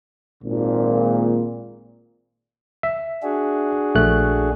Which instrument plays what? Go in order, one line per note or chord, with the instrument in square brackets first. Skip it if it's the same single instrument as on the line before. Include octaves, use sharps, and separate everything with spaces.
[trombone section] G#1 A#2
[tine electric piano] E5
[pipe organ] D4 F#4 G#4
[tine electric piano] A#1 A3 F#6